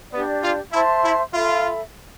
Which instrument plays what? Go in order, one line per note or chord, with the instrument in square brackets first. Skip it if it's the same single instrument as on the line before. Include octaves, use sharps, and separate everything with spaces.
[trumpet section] B3 [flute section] D4 G4 D5
[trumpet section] F4
[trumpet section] E4 [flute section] C5 E5 A5 C6
[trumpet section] E4
[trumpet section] F4 [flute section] A4 E5 B5